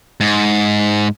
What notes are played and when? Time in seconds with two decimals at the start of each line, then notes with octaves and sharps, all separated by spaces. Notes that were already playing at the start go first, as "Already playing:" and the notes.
0.21 G#2